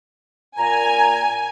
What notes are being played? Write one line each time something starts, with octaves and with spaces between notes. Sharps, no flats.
A#2 G#5 A#5